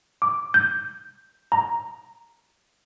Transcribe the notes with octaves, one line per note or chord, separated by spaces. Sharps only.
D6
G6
A#5